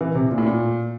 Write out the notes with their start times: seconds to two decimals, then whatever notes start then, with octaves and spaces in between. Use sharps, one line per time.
0.01 E3
0.15 C3
0.31 A#2
0.38 A2
0.46 A#2